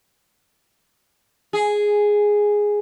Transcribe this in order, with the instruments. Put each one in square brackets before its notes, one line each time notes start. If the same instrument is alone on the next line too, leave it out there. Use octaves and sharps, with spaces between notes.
[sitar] G#4